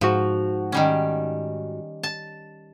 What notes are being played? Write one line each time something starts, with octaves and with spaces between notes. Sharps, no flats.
G#2 F3 F#4
D#3 G3 C#4
A5